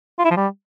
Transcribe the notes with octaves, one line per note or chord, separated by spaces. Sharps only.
F4
E4
F3
G3